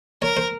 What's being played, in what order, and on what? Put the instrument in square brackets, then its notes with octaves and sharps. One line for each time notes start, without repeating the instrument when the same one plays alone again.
[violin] A#4 [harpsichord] C#5
[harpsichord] C5